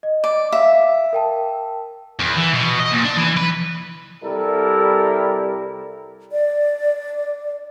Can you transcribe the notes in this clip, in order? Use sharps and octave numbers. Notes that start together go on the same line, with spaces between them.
D#5
D5
E5 F5
A#4 G5 A5
E2
E3
B2
D#5
A#2
D4
E3
B4
C2 G3 E4 G4 A4 A#4
D5